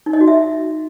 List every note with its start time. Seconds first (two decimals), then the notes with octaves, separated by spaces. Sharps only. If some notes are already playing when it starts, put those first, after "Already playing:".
0.06 D#4
0.13 D#5
0.20 F#4
0.28 E5